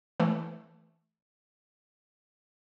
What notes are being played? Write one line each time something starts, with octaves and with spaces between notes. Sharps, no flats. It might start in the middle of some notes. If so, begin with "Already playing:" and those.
E3 A3